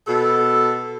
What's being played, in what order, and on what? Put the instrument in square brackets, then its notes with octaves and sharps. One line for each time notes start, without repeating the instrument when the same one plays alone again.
[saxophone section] B2 A4